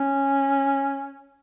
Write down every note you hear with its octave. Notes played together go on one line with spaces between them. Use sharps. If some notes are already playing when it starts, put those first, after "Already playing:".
Already playing: C#4